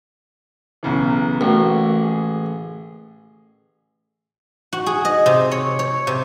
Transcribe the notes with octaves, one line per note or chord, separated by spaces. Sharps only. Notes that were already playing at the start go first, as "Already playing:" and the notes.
B1 C#3 E3
A1 A#3 F#4
G#4
F#4
G#4
D#5
C3
C#5
C#5
C3